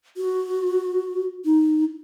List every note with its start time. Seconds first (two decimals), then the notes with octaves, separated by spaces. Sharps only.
0.17 F#4
1.45 D#4